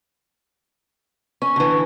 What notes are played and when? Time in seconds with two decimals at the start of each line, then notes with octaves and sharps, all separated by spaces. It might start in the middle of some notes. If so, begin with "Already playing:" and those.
1.42 C#4 C#6
1.56 D3 E3